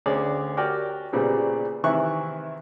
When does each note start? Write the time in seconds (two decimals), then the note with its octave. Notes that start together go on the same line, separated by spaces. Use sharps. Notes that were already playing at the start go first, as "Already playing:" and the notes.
0.06 D2 C#4 G#4 D5
0.57 F#4 G4 A#4 D5 G5 G#5
1.13 A#2 C#3 G3 G#3 B3 C4
1.84 C3 D#3 E3 E4 C#6 F#6